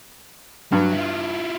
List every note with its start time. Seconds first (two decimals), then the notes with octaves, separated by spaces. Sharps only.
0.72 G2 F#3
0.93 E4 F4